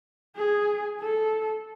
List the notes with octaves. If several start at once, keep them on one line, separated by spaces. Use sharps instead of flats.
G#4
A4